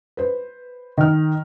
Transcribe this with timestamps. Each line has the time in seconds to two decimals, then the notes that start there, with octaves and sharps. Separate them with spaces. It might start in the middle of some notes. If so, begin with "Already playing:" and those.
0.17 B4 C5
0.98 D#3 F6